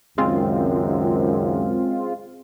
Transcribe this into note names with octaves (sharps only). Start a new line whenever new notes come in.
C#2 F#2 D#3 G#3 C4 F4